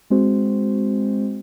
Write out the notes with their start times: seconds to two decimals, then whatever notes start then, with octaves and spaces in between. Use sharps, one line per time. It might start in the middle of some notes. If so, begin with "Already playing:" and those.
0.10 G#3 C4 F#4 C5